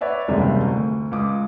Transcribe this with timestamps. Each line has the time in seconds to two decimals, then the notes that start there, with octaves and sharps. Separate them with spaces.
0.01 B4 C#5 D5 E5 F#5
0.28 F#1 D#2 C3 G3 G#3 E5
0.66 D2
1.12 C#2 D6 D#6